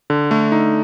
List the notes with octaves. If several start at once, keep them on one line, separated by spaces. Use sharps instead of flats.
D3
A3
D#4